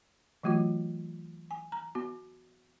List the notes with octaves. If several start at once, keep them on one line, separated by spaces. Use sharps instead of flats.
E3 F#3 A3 F4 F#4
G#5
A#5
B3 F#4